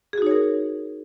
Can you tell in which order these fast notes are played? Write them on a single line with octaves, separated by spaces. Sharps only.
G#4 F#4 D#4 C#5 A#4